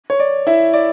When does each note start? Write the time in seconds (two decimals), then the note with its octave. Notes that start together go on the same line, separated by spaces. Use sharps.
0.10 C#5
0.20 D5
0.47 E4 E5
0.73 D5